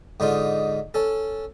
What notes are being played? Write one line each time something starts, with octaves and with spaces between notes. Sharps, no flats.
G#2 D3 D#4 F4
C#4 A4